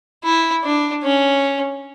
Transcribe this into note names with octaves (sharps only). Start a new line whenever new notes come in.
E4
D4
C#4